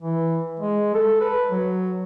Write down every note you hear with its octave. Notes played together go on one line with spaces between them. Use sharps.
E3
G#3
A4
B4
F#3